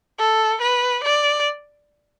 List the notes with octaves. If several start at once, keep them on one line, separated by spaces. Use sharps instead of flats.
A4
B4
D5